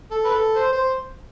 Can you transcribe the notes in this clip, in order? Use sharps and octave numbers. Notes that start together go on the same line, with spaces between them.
A4
B4
A4
C5
C5